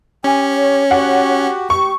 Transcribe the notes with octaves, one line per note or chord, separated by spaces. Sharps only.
C#4 G4 G#5
C#5
F#4 G4 F#5
G4 C#6